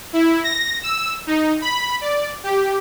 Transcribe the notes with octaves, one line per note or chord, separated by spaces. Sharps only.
E4
A#6
E6
D#4
B5
D5
G4